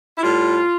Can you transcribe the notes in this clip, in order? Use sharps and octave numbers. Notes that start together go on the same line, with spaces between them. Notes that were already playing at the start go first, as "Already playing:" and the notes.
E4
A2 G3 F4